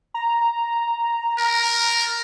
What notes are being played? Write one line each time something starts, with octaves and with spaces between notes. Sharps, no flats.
A#5
A#4